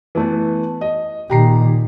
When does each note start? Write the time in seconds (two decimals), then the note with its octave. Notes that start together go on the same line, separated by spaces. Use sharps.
0.15 E3 A3 B3
0.81 D#5
1.30 A#2 D#3 G4 A#5 C7